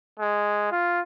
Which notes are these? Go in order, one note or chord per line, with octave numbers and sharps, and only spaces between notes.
G#3
F4